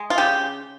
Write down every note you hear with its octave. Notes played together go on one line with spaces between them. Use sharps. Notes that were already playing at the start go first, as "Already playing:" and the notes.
Already playing: G#3
F4
C#3 G4